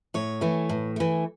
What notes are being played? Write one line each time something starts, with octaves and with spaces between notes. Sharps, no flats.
A2 C#5
E3 A3
A2
E3 A3